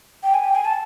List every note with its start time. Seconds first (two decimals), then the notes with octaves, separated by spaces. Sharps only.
0.23 G5
0.34 G#5
0.44 G5
0.55 G#5
0.65 A5